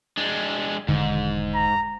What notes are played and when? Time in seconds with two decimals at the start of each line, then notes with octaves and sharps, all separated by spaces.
0.17 G#3 D4
0.88 E1 G#2 D3 D#3
1.54 A#5